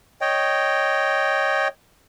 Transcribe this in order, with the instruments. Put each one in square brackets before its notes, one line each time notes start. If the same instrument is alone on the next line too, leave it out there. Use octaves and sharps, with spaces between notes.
[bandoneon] C#5 D#5 G5